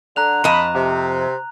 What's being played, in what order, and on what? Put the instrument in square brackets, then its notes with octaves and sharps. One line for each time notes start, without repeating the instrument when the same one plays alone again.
[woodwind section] D3 [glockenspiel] A#5 F#6 F7
[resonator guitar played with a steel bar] F2 D#5 A5 [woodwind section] B5
[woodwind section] C3